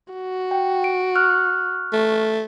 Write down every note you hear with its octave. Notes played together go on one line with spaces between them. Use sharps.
F#4
G5
D7
C#6 F6 F#6
A3